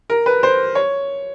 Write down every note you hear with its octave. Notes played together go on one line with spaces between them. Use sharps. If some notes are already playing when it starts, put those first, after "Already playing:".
A#4
B4
C5
C#5